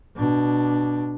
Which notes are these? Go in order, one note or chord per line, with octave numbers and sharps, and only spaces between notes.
B2 D4